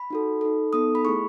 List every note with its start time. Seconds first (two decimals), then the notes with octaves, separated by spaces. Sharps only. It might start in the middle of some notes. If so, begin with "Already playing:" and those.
Already playing: B5
0.10 D#4 F#4 A4
0.41 D#4 A4
0.73 B3 D#4 A4 D#6
0.95 B5
1.05 A3 E4 G#4 C#6